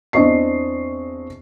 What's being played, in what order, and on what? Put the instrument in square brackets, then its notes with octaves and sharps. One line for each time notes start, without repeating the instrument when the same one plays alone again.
[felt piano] E2 C4 D4 D#5 C#6 C7